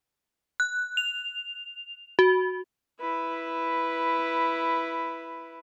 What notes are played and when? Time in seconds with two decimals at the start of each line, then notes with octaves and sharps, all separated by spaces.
0.60 F#6
0.97 F7
2.19 F#4
3.00 E4 B4